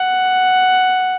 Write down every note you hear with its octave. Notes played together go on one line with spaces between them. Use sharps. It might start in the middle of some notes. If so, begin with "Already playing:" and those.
Already playing: F#5